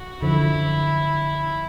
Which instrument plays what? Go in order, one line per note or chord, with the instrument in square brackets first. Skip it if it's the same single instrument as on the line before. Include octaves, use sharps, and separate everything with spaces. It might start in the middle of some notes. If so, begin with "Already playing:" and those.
Already playing: [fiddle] F#4
[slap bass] F#2 D3 F3 [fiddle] E4